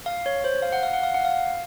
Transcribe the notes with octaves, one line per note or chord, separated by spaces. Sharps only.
F5
C#5
C5
F5
F#5
F5
F#5
F5
F#5
F5